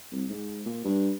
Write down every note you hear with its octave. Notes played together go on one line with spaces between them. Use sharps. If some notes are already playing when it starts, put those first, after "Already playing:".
C2
G#2
A#2
G2